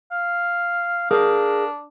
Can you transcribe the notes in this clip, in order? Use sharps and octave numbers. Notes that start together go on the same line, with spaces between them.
F5
D4 G#4 A#4 F5